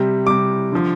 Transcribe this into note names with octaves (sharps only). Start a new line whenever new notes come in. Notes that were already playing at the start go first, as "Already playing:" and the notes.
Already playing: C3 G3
C3 G3 D6
D3 F3